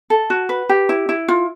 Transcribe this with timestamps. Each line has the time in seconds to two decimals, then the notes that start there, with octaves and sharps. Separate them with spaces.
0.10 A4
0.30 F#4
0.49 B4
0.69 G4
0.89 E4
1.09 E4
1.28 F4